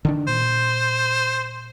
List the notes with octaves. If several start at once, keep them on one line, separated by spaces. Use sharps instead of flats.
D3 D#3 D4
A#2 C5